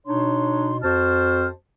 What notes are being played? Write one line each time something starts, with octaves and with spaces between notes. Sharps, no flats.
B2 D4 D#4 C#5 C6
F2 F#4 C5 A5 F6